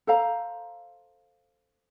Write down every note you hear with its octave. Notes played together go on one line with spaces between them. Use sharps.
A4 C5 F5 A#5